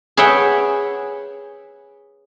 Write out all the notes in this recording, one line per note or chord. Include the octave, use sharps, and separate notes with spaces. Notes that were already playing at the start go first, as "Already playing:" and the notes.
G#4 B4 C#5 E5 F#5 G5